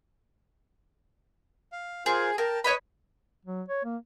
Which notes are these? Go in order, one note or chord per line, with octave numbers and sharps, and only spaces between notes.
F5
F4 G#4 A#4 C5
A#4 G5 A5
B4 C#5 D#5 B5
F#3
C#5
A#3